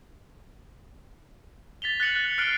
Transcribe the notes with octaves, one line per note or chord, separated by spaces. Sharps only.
A6 B6 F7 G7
F#6 A6 C#7 F#7
F#6
F6 F#6 A6 C7 D7 G7